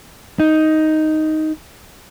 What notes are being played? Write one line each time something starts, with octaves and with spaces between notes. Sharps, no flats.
D#4